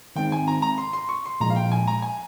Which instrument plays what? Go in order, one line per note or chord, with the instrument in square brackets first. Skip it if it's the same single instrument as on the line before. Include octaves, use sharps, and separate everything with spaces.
[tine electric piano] D#3 G#3 C4 D#4 [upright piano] G5
[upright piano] G#5
A#5
A#5
C6
C6
C#6
C6
[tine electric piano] A#2 F3 G#3 [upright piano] A#5
[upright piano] F5
G5
G#5
A#5
G#5